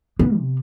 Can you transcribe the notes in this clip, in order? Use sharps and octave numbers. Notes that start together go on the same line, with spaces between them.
B3
C3